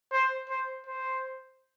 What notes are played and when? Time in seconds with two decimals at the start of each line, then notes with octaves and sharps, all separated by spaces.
0.12 C5
0.49 C5
0.86 C5